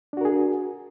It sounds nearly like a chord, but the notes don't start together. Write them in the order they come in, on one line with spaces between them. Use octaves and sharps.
D4 F#4 A#4 G#4